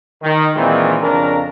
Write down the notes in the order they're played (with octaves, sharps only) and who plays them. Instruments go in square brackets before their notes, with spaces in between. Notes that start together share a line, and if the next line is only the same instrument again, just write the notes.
[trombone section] D#3
A#2 D#3 E3 G#3 C4
F2 C#3 D4 A#4